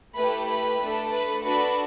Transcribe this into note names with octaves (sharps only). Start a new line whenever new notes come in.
A3 E4 G4 B4 B5
B4 B5
A3 D4 A4
B4 B5
D4 F#4 A4 B4 B5